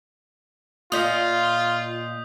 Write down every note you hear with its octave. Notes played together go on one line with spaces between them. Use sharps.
A#2 F4 D#5 D#6 G6 B6